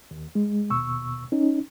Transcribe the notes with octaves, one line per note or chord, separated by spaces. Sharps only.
D#2
G#3
D#2 B2 C#6 E6
C#4 D#4